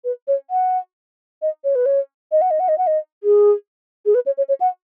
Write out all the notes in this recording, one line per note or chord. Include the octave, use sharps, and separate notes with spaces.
B4
C#5
F#5
D#5
C#5
B4
C#5
D#5
F#5
D#5
F#5
D#5
F#5
D#5
G#4
G#4
B4
C#5
C#5
C#5
F#5